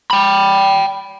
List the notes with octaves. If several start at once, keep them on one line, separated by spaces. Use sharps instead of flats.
G5 B5